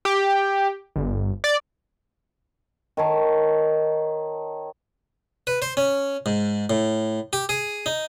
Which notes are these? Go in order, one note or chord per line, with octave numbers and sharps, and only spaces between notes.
G4
G1
D5
D#3 C#5 A5
B4
C5
C#4
G#2
A2
G4
G#4
D#4